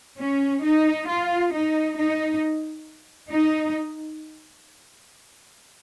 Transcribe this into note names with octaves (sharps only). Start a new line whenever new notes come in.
C#4
D#4
F4
D#4
D#4
D#4